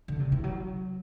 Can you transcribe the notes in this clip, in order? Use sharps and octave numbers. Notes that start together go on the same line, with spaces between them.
D3
C3
E3
F#3